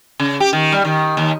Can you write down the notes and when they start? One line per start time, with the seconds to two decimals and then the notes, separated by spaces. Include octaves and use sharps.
0.20 C#3
0.40 G4
0.53 D#3
0.72 G3
0.85 D#3
1.17 D#2